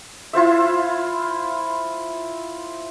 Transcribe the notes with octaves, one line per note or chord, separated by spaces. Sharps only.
E4 F4 C5 E5